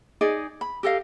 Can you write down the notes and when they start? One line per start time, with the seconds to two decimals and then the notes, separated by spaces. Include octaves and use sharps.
0.21 D#4 G#4 D5 D#5
0.61 B5
0.83 G4 A4 D#5 F5